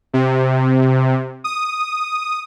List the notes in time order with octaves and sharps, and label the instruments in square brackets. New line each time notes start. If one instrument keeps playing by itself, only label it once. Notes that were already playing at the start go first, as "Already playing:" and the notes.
[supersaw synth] C3
D#6